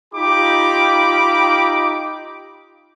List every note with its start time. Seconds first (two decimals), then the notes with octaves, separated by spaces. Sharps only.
0.13 D#4 F4 G4 G5 B5 D6